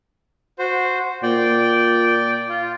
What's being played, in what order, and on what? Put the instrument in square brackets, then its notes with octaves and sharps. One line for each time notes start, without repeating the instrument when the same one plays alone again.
[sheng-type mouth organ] F#4 C5
[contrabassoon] A#2 [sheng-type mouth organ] D5 G5
[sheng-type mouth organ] F4